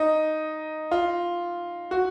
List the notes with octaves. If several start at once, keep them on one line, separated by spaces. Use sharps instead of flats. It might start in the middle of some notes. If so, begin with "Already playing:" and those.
Already playing: D#4
F4
F#4